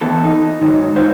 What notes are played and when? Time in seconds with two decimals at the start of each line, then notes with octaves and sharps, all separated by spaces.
0.01 E3 B3 A4
0.23 D#4
0.61 G#2 D#3 F#3
0.96 D#4 F4 F#4 B4 C5